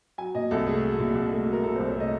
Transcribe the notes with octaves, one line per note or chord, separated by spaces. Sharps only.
F#3 G#5
A#2 D#5
C2 A4
A3 G#4
F#3
A#2
C2
A3
F#3
A#4
A#2 A4
C2 C5
C#5
A3 D#5